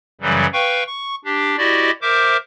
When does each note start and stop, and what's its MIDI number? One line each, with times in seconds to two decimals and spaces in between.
0.21 0.46 42
0.21 0.46 49
0.21 0.46 52
0.21 0.46 54
0.21 0.46 55
0.53 0.83 71
0.53 0.83 77
0.53 0.83 79
0.53 0.83 85
0.87 1.15 85
1.25 1.57 62
1.25 1.57 67
1.58 1.91 64
1.58 1.91 66
1.58 1.91 67
1.58 1.91 74
1.58 1.91 75
2.02 2.37 70
2.02 2.37 72
2.02 2.37 76
2.02 2.37 86
2.02 2.37 91